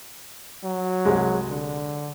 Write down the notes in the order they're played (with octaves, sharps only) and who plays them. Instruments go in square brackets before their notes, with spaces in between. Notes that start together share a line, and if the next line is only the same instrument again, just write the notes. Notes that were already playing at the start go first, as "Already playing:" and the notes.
[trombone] F#3
[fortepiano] C2 G#3
[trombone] D3